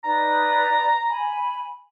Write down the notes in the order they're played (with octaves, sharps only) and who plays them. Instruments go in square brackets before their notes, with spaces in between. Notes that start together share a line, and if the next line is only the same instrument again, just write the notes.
[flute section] D#4 B4 D5 [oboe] A#5
[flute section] G#5 B5